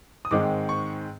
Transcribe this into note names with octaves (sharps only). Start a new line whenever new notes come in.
D#6
G#2 D#3 G#3 C4 D6
C#6